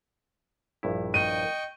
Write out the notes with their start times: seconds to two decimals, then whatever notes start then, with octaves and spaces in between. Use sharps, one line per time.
0.83 A#1 G2 E4
1.14 D#5 G5 C#6 D#7